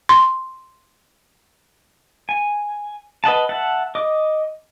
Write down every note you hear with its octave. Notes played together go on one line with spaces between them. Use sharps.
C6
G#5
B4 D#5 F#5 A5
E5 F#5 A5
D#5 D6